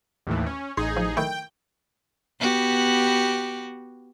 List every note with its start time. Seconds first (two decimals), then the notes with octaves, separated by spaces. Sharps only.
0.27 D#2 A2 E3
0.46 C#4
0.77 A1 D#4 G#4 C6
0.97 F3
1.17 D#3 A3 E4 G5
2.39 B3 F#4 G4